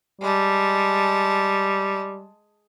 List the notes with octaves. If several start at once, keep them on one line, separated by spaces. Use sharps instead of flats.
G3 G#3 A5